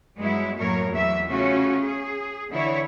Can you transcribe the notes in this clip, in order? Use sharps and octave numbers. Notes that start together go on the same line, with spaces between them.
G2 F#3 G#3 B3 E4
F#2 A2 F#3 A#3 A#4 C#5
E2 E3 F#3 E5
C#3 A3 C#4 F4 F#4
G#4
D3 E3 E4 C#5